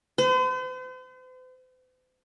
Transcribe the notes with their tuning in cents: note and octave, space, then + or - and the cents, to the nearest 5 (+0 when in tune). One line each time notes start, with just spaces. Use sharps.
C5 -45